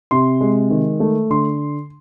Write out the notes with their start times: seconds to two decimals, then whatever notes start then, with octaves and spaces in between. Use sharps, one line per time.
0.11 C3 C6
0.41 G#3
0.70 D#3
1.00 A3
1.30 D3 C6